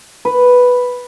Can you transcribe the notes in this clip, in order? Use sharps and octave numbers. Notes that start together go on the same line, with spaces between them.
B4